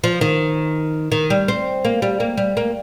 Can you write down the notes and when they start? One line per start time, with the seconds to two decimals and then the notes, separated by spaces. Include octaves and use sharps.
0.04 F3
0.21 D#3
1.12 D#3
1.30 G3
1.48 C4
1.85 A#3
2.02 G3
2.20 A#3
2.37 G3
2.57 A#3